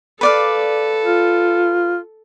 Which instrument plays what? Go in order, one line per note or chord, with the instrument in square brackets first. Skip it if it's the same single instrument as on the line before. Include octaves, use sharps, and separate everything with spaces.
[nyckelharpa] A4 [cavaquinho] B4 D5 F5
[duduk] F4